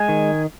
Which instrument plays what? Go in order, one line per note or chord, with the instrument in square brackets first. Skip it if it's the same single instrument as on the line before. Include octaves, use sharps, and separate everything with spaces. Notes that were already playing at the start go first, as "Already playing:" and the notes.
Already playing: [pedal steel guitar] G#3 G#5
D#3